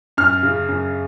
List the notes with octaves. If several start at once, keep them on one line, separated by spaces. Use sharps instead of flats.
F#2 F6
C#3
F#2